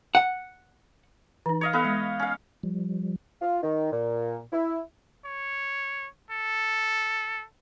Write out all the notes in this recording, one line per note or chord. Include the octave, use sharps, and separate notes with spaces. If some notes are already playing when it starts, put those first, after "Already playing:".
F#5
E3 D#4
C#5 D#5 F5
B3 A4 B4 D#5 F5
G#3
C#4 F5
F3 G3
F4
D#3
A#2
E4
C#5
A4